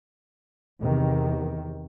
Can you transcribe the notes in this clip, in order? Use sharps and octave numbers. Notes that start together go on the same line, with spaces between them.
E2 C3 D#3